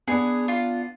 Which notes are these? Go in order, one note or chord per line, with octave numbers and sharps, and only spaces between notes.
B3 D4 G#4
F4